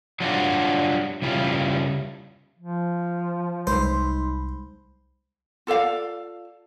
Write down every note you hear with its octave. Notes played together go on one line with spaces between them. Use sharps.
F#3 G3 D4 F4 F#4
C#3 G3 E4 F4
F3
C2 F#3 G#3 D#4 C5 B5 C6
F4 A4 D5 F5